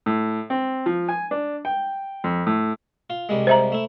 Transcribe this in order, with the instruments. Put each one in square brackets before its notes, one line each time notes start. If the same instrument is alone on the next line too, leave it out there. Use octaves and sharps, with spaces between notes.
[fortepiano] A2
C4
F3
G#5
D4
G5
F2
A2
[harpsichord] F4
C2 G3 G#3
[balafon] C5 E5 A#5
[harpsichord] A3 E4